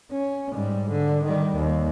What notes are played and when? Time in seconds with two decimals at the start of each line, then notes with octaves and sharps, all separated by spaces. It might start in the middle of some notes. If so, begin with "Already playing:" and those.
0.11 C#4
0.53 G#2 G3
0.90 D3
1.25 D#3 G3
1.56 D#2